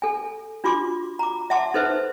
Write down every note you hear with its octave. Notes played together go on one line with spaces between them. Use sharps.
A4 G#5
D4 F4 F#4 C6 D6
A#5 D6
E5 F#5 A5 C6 D6
D#4 A4 B4 C5 E5